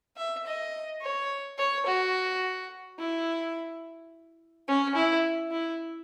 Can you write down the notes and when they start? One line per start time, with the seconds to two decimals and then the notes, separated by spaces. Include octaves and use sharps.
0.17 E5
0.46 D#5
1.02 C#5
1.58 C#5
1.86 F#4
2.99 E4
4.68 C#4
4.95 E4
5.51 E4